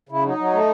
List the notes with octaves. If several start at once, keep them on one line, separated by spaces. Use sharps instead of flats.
C#3 E4
F#3 D#4
F#3
A3